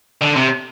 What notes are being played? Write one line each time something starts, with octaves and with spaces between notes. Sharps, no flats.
D3
C3